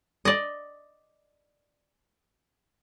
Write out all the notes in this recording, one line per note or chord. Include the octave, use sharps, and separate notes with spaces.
D5 D#5